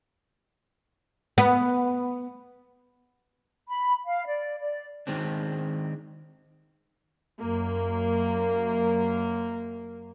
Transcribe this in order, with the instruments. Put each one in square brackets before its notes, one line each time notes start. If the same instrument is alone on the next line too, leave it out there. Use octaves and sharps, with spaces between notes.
[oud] B3
[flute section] B5
F5
D5
D5
[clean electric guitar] D#3 G#3 C4 D4
[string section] F#2 A#3